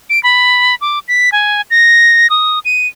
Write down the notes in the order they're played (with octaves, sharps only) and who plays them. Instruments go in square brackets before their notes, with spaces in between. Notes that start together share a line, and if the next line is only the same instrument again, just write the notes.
[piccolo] D7
B5
D6
B6
G#5
A#6
D#6
D#7